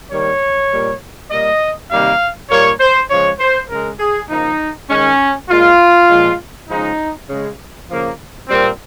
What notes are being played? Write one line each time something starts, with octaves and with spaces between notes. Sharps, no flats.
D#3 G3 A#3 C#5
A#2 G3 A#3
A#2 G3 A#3 D#5
C3 D#3 G3 A#3 F5
A#2 G3 A#3 C#5
C5
C#3 F3 G#3 C#5
C5
C#3 G#3 A#4
G#4
C#3 F3 A#3 D#4
D#3 G#3 C#4
A#2 G#3 F4
A#2 F3 G#3
C#3 F3 G#3 D#4
C#3 G#3
C#3 F3 A#3
A#2 G3 A#3 C4